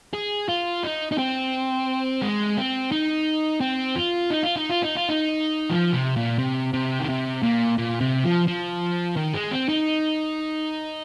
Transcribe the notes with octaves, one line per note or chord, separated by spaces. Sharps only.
G#4
F4
D#4
D#4
C4
G#3
C4
D#4
C4
F4
D#4
F4
D#4
F4
D#4
F4
D#4
F3
C3
A#2
C3
C3
D#3
C3
A#2
A#2
C3
F3
F3
D#3
G#3
C4
D#4